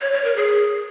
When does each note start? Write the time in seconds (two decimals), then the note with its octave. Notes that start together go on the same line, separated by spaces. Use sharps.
0.01 C#5
0.13 C#5
0.24 A#4
0.36 G#4